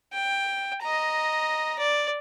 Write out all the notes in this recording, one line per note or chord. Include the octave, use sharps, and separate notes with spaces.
G5
D#5 A#5
D5